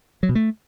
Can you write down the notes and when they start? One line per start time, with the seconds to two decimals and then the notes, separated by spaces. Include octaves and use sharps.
0.23 F#3
0.29 B2
0.35 A3